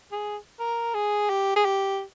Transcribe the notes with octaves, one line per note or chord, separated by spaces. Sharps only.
G#4
A#4
G#4
G4
G#4
G4